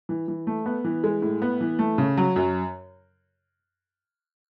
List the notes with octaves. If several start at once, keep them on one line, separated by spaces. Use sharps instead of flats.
E3
E3
A3
B3
E3
G#3
A2
B3
E3
A3
C#3
F#3
F#2